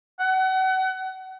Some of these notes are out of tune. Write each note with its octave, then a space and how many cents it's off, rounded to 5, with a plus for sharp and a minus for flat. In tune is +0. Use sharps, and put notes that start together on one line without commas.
F#5 +30